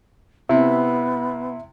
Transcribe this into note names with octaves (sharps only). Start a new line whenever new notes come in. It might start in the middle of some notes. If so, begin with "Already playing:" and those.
C3 B3 E4 E5